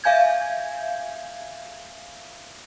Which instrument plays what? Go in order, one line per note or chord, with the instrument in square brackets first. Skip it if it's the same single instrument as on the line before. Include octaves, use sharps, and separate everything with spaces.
[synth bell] E5 F5 G#5 G6 G#6